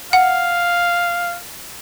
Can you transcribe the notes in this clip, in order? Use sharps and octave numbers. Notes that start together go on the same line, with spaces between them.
F5 F#5